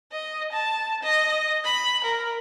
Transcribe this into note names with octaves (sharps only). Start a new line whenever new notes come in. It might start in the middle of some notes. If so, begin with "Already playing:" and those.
D#5
A5
D#5
B5
A#4